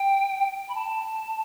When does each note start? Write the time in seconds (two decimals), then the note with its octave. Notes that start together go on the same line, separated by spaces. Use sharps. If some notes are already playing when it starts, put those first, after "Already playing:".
Already playing: G5
0.69 B5
0.75 A5